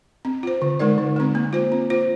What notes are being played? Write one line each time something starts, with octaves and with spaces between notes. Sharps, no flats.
C4
F4 C5
D3
G#3 D#4 A#4 D5
D3
G#3 C4
A#3
F4 C5
C4
F4 C5